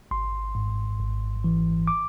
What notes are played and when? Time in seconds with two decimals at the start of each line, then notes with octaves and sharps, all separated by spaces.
0.11 G#1 C6
0.55 G#2
0.99 G#1
1.44 E3
1.87 D6